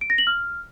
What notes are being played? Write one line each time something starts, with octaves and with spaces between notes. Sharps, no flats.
D7
A#6
F#7
F6